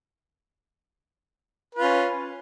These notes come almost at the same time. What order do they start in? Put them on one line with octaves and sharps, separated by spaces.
B4 F4 C#4